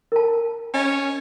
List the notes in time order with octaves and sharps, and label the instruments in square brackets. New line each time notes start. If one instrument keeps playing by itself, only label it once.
[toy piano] A#4 A5
[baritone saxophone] C#4 [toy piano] D#5 G#5